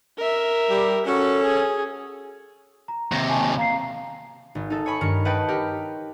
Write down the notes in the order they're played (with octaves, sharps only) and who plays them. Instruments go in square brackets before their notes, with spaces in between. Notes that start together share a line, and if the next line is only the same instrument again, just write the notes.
[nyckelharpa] A#4 E5
[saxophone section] G3 G4
[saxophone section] C#4 A4 [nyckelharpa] F#4
[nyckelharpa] G#4
[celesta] A#5
[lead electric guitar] D#2 C3 [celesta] A#6
[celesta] G#5 A5 C#6
F5 A#5 C7
[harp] G#1
D#4 A4
C#5 G#5 B5 C#6
G2 D#3 A#4 C#7
B4 D#5 F#5 G5 A5
G4 A#4